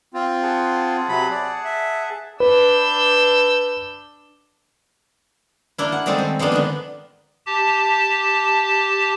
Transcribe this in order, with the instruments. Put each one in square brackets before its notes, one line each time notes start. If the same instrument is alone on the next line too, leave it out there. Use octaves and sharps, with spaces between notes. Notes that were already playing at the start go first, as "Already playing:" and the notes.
[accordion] C4 F4
[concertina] G#4 F#5 A5
[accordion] C3 F#3 B5
D5
E5
[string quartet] D4 E6 G6 [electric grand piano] B4
[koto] A#3 D4 E4
F#5
D#3 G3 G#3 C4 A4
C4
F3 G#3 A#3 B3 D4
D3 D#3 B3
[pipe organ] G4 A5